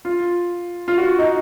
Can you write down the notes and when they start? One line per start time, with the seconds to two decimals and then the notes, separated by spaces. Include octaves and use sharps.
0.05 F4
0.88 F4
0.98 F#4
1.19 D#4